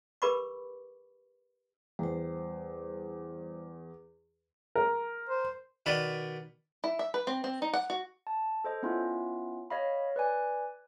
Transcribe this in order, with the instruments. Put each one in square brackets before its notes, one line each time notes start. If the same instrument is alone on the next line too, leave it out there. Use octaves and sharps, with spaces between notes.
[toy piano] G4 A#4 B4 B5 C#6 D6
[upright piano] E2 [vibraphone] G3 C5
[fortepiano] A#4
[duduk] C5
[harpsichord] B2 D#3 B4 D5
[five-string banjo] E4
E5
B4
C4
C4
D#4
F#5
F#4
[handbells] A5
A4 C5 D#5
B3 C#4 E4 F4
C#5 D#5 F5 B5
B4 D5 G#5